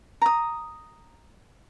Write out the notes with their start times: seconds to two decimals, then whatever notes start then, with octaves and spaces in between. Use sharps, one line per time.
0.22 A#5 D#6